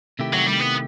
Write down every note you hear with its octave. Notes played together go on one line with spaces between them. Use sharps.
C3 D#3 A3 E4 G4
F#3
G3
B3